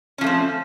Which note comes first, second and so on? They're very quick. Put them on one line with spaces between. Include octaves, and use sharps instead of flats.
C#4 F3 A3 C4